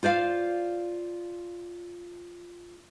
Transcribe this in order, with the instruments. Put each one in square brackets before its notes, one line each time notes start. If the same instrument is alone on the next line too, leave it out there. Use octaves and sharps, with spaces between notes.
[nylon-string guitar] F4 C5 D5 F5